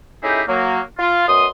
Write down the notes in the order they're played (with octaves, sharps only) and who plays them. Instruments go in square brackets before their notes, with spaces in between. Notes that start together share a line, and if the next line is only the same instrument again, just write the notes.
[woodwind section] A3 C#4 D#4 E4 G4 G#4
F#3 A#3
F4
F#2 B2 C6 D#6